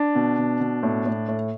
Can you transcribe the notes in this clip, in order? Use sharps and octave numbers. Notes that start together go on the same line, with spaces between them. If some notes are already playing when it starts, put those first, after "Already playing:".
Already playing: D4
B2
B2
B2
A2
A2
A2